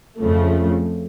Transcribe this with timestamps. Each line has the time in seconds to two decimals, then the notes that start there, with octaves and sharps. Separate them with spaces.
0.19 F2 C#3 F3 A3